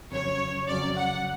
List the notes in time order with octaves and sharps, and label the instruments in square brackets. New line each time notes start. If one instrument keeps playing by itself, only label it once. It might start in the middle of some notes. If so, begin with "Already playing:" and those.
[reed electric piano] F2 C#3 F#3 C#4 [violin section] C#5
[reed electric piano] F2 C#3 F#3 C#4 [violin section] D5
[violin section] F#5